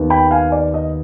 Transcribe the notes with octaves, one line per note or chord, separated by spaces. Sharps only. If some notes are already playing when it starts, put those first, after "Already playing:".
Already playing: D#2 D#3 B3
G5 B5
F5 G#5
D5
D#5